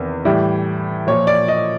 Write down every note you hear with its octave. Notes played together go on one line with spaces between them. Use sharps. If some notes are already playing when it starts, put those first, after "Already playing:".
Already playing: E2 C3 D#3
A2 E3 G3
A#2 F3 C#5
D5
D#5